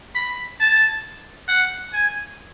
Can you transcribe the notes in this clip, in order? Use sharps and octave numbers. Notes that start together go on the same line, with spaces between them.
B5
A5
F#5
G#5